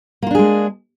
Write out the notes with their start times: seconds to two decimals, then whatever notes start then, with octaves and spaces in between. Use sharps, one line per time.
0.22 A#3
0.27 F4
0.31 D4
0.35 G#4
0.39 G#3